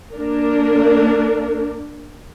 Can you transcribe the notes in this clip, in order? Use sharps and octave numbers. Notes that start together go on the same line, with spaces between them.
A#3 D4 A#4